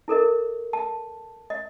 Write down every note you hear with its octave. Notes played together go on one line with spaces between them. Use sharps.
E4 A4 A#4 D#5
A5
D#5